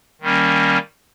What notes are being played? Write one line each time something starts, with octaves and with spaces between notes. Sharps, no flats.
D#3 G3 A#3 C#4